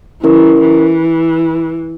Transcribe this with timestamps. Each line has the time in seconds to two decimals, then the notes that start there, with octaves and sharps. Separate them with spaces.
0.22 E3 C#4 E4 A#4
0.60 E3